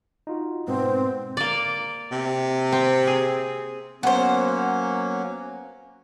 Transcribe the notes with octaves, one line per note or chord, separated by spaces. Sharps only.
D#4 F4 F#4
G#2 B2 B3 C4
A#3 D5
C3
C4
G#4
F#3 A#3 B3 C#4 C5